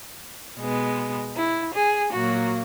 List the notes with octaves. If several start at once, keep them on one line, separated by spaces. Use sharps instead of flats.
B2 G#3 B3
E4
G#4
A#2 F#3 A#3 F#4